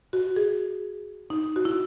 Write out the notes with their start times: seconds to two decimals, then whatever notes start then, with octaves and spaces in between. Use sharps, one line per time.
0.13 F#4
0.36 G#4
1.30 D#4
1.56 F#4
1.65 E4